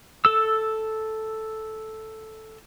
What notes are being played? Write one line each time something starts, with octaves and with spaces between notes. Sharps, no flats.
A4 E6